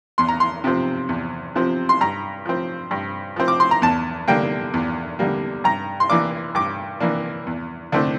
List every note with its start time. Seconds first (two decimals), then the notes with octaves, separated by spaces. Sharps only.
0.18 E2 C6
0.28 A#5
0.40 C6
0.64 C3 F3 C4
1.09 E2
1.55 C3 F3 C4
1.89 C6
2.01 G2 A#5
2.45 F3 C4
2.91 G2
3.36 F3 C4
3.48 D6
3.60 C6
3.71 A#5
3.82 E2 A5
4.28 D3 G3 A#3 G5
4.74 E2
5.19 D3 G3 A#3
5.64 G2 A#5
6.00 C6
6.09 E3 A#3 D4 D6
6.55 G2 D6
7.00 E3 A#3 D4
7.47 E2
7.92 D3 A3 C4